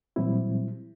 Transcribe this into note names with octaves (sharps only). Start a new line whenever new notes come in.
A#2 E3 F#3 G3 C4 E4